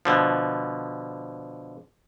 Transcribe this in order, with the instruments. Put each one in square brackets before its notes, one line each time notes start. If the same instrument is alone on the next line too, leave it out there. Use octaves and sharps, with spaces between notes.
[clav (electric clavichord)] B2 D3 F3